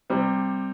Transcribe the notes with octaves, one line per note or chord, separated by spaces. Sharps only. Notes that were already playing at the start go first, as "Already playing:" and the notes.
C3 G3 C4